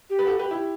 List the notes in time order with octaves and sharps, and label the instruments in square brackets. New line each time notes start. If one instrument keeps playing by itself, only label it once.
[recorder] G4
[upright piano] B4
F#4 A4
G4 B4
E4 G4